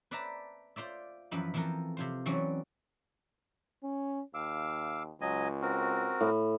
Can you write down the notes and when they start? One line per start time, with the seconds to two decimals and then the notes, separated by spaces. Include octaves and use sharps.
0.11 B4 C5 D5 E5 A5 A#5
0.76 F4 C5 D5 E5
1.31 F#2 E3 F3 B4 B5
1.54 E3 F3 C4 A4 A#4
1.97 C3 F4 C5
2.26 E3 F#3 C4 C#4 D5
3.84 C#4
4.34 D#2 F5 D6 E6
5.21 C#2 F#3 D#5 G#5
5.62 C4 F#4 A#4
6.21 A2